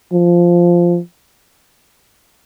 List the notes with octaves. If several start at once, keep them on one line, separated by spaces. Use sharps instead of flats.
F3